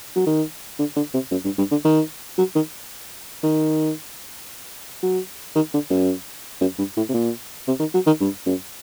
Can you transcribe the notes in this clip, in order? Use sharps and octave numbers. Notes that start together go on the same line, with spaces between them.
F#3
D#3
D3
D3
C3
F#2
G2
G2
D3
D#3
F#3
D#3
D#3
F#3
D#3
D3
F#2
F#2
G2
A2
C3
A#2
C3
D#3
F#3
D#3
G2
F#2